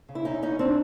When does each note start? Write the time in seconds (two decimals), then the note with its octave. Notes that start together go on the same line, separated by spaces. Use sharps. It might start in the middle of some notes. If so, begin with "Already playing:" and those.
0.09 C#3
0.15 E4
0.25 E2 C#4 D#4
0.42 E3 C#4 D#4
0.59 C4 D4